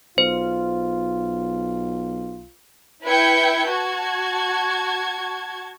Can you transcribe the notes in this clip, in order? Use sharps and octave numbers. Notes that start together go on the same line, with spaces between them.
B1 F4 C5
E4 B4 G5 G6 G#6 C#7
F#4 A5 G#6